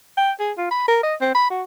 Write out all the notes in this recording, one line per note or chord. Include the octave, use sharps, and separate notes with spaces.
G5
G#4
F4
B5
A#4
D#5
C4
B5
F#4